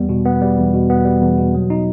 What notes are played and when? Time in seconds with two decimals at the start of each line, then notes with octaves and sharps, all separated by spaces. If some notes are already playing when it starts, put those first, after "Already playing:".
Already playing: E2 G3 B3
0.09 B2
0.25 B3
0.41 G3
0.58 E2
0.73 B2
0.90 B3
1.05 G3
1.22 E2
1.38 B2
1.54 F#3
1.70 D#4